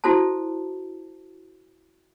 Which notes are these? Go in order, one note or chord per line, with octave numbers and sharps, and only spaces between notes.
E4 F#4 A4 C5 A5